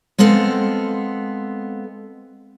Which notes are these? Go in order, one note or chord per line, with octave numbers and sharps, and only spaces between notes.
G#3 B3 C4 A4 F5